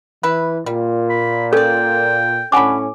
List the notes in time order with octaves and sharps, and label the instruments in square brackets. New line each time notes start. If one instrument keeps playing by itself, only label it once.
[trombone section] E3 [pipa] E4 B4
[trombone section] A#2 [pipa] G3
[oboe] B5
[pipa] C#4 D5 [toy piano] A4 [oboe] G5
[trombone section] A2 C#4 [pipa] D4 F#4 B5 [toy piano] G#5 D6